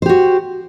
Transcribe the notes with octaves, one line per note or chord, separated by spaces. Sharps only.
F#4 G4 C5